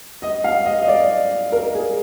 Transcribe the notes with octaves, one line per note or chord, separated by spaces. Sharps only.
D#5
F5
D#5
D#5
D5
A#4
G#4